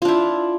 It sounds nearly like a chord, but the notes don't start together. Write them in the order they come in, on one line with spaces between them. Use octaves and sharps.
F4 D4 E4